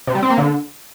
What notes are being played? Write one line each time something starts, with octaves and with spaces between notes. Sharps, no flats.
C3
G3
C4
A#3
D3